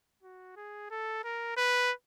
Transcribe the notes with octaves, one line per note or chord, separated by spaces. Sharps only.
F#4
G#4
A4
A#4
B4